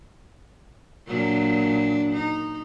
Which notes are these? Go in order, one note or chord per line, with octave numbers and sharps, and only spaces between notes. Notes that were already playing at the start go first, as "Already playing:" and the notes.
A#2 F#3 D4
D#4